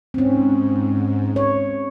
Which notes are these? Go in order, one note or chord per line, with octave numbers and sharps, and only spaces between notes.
G#2 C4 C#4
C#5